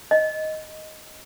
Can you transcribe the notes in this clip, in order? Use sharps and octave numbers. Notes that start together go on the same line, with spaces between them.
D#5